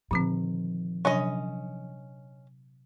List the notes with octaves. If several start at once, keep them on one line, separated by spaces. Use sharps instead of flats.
A#2 D3 D#3 F3 C4
C3 F#3 C#4 D4 D#5